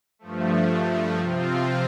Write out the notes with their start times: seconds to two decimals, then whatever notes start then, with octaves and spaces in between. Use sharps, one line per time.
0.19 G2 F3 A3
1.18 C3 F3 C4 F4